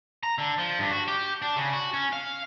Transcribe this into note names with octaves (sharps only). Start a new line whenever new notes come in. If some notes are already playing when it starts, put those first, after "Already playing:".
A#5
D3
F3
G2
F#4
G4
D4
C#3
F#4
C#4
F5